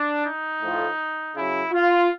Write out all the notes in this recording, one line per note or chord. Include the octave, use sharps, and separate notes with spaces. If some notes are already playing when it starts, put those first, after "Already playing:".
Already playing: D4
D#4
A2 F3
C#3 F#3 E4
F4